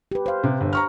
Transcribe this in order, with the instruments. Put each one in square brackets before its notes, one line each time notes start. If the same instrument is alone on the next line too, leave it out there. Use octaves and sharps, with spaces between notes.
[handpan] G4 B4
C5 F5
[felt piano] C3
G1
A#5 C#6 F6